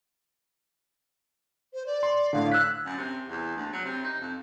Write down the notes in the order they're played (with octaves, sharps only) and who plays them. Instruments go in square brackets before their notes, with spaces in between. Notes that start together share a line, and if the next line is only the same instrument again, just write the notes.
[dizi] C5
D5
[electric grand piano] C6
[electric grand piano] A2 D3 [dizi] F5
[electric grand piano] E6 G#6 B6 [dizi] F#6
[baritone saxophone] F#2
C3
E2
D2
F#3
C3
D#4
F2